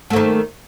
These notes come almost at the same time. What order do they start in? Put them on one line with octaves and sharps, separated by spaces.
A3 A#3 D#3